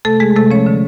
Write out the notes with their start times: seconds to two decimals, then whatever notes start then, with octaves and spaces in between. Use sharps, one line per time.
0.05 C3 A3 A4
0.20 G#3 G#4
0.36 C3 A3 A4
0.51 F3 C#4 C#5
0.66 D3